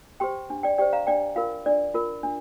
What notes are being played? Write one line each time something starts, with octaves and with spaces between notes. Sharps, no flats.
G4 C5 G5 C6
D4
D5 G5
G4 C5 D5 G5
F5 A#5
D4 D5 G5
F4 A#4 F5
D4 D5
F4 A#4
D4